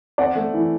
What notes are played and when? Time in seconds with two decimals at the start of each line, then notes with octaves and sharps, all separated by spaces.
0.18 C4 D5 F#5
0.35 A3
0.54 E3